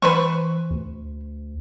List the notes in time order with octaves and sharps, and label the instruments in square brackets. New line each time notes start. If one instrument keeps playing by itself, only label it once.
[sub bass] E3 [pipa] B4 C5 C#6
[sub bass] D2